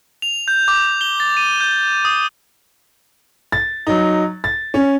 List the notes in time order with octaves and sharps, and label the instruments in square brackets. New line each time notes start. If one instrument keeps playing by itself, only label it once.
[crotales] F7
G6
D6
G7
A6
D#7
G6
D#6
[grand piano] A6
F#3 D#4
A6
C#4